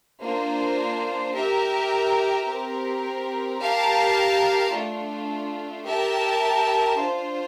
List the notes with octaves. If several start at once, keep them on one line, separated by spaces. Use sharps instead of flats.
A#3 D4 F4 C5
G4 A#4 E5
C4 G4 A#4
G4 A#4 F5 A5
A3 D4 F4
G4 A#4 E5 A5
D4 F4 C5